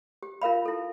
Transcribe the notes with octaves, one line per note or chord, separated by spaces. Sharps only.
G4
F4 A#4 F5 B5
E4 A4